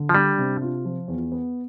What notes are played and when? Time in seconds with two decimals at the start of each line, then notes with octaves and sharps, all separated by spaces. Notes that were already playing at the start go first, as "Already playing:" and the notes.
Already playing: D3
0.09 F3
0.15 G3 D4
0.38 C3
0.62 F4
0.85 F3
1.08 E2
1.32 B3